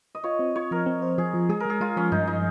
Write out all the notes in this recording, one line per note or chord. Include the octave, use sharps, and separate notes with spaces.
D#5
F4 C#5
C4
F4 C#5
F3 A#4
C4
C5
F3 G#4
F3
G#3 G#4
A#4
G#3 G#4
G#3 F4
F3 C#4
G2 D#4
F3 D#4